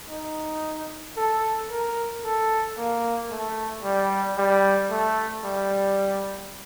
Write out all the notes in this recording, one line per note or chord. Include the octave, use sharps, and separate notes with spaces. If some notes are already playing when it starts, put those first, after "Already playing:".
D#4
A4
A#4
A4
A#3
A3
G3
G3
A3
G3